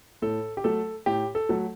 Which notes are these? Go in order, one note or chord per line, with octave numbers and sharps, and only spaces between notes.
A2 A4
G4
F#3 A3 A4
A2 G4
A4
F#3 A3